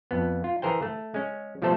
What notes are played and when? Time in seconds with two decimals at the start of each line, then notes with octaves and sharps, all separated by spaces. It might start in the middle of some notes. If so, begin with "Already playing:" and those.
0.11 F2 B3
0.44 F4
0.62 E3 G#4 A#4 C5 G5
0.82 A3
1.14 G#3 C#4
1.62 B2 F3 G3 A3 A4 C5